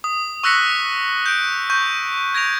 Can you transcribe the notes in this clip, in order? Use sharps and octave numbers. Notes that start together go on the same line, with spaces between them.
D#6
C#6 E6 F#6 A#6 B6 C#7
G6 D7
C#6 G6
G#6 A#6 D7 F7